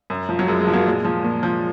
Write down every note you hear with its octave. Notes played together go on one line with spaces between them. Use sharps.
F#2
F3
F#3
F#2 G#3
G#3
F3
F#3 A#3
A#2 G#3
F3
A#2
F3